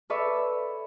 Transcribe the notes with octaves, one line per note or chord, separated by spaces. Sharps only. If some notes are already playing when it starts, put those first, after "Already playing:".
A4 B4 C#5 D5 E5